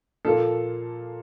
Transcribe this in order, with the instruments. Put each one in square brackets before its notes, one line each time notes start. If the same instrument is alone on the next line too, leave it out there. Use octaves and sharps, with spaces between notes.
[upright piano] A#2 F3 A#3 F4 [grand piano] A4